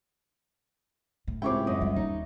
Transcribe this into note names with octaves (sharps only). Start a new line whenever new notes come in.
A2
C#2 C4 E4 G4 C#5 G5 D6
F#2 D#5
G3
D#2 D#4